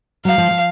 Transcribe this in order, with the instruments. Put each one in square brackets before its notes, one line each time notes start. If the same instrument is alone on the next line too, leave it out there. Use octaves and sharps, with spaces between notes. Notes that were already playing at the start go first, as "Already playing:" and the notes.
[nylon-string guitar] F#3 [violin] F5
[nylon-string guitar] F3
F3